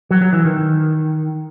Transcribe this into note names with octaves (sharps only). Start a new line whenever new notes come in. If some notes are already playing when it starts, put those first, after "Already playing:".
F#3
F#3
E3
D#3